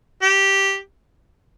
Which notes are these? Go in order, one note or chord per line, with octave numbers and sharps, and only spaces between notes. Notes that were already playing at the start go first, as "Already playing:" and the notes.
G4